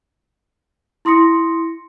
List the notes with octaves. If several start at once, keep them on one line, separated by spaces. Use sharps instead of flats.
E4 C6 D#6 A#6 C#7